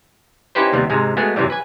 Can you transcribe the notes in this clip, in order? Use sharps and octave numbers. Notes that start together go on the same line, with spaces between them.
C#4 D#4 E4 G4 B4 C5
D#2 C3 G3 B3
G#2 C3 G#3
G#3 A3 B3 F#4 G#4
F#2 C3 E3 F#3 G3
B4 G#5